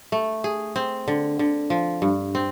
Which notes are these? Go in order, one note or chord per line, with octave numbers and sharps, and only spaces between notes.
A3
G#4
C4
D3
D3
F3
G2
C4